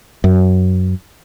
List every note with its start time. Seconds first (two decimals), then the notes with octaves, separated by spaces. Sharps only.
0.24 F#2